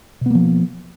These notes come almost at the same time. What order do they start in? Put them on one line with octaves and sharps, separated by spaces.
B2 B3 A#3 F3